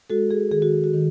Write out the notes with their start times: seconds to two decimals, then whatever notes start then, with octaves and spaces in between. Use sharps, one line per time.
0.10 G#3 F#4 A4
0.31 G#4
0.51 D#3 G#4
0.62 F#4
0.84 F#4
0.93 D#3